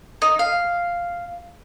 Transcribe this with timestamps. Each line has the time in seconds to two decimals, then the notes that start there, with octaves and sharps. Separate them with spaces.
0.22 D#4
0.39 F5